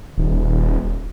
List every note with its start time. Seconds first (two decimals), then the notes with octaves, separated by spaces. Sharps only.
0.18 D#1